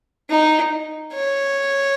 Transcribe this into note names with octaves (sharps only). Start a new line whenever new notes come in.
D#4
C#5